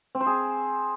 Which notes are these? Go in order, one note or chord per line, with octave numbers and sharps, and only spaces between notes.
C4
C5
G#4